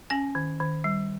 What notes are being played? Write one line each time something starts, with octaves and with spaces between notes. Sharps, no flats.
C#4 G#5
D#3
D#3
G3